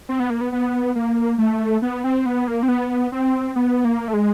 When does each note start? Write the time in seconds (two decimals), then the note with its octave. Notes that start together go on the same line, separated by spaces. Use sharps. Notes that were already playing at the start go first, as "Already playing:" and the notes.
0.09 C4
0.20 B3
0.30 A#3
0.41 B3
0.52 B3
0.96 A#3
1.38 A3
1.82 B3
2.04 C4
2.26 B3
2.48 A#3
2.63 C4
2.69 B3
3.12 C4
3.56 B3
3.85 A#3
4.08 A3
4.14 G#3